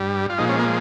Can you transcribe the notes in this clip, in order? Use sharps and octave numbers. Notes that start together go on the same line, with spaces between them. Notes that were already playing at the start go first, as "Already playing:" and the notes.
Already playing: G2 G3
F4
A#2 F3 G#3 D#4
C#4
A#3